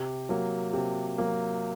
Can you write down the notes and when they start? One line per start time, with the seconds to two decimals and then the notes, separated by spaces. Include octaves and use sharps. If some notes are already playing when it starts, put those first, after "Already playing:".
Already playing: C3
0.29 F#3 A#3
0.73 C3
1.18 F#3 A#3